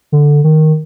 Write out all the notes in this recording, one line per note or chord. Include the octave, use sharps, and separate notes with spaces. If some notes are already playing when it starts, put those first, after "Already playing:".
D3
D#3